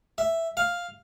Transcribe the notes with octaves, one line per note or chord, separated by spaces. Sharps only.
E5
F5